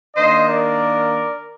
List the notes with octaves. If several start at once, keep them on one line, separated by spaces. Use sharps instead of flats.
D#3 A#3 D4 C5 D#5
A#4 D5